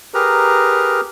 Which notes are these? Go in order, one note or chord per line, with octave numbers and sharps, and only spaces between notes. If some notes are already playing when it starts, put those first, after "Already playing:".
G4 G#4 A#4 B4 A#5